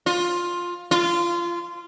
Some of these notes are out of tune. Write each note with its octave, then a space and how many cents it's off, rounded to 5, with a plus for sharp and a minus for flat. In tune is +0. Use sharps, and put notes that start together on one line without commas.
F4 +10
F4 -20